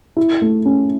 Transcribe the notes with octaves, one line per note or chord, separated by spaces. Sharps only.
E4
A3
C#4